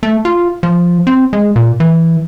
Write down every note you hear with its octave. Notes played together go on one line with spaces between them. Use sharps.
A3
F4
F3
C4
G#3
A#2
E3